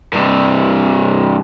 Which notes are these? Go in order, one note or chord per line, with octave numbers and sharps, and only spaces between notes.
G2 C3